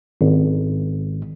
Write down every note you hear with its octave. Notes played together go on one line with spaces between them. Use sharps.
G#1